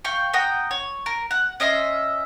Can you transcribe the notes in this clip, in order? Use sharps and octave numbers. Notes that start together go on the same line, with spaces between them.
F5 G5 C#6
F#5 G5 A#5 D#6
C#5
A#4
F#5
C#4 D#5 E5 C6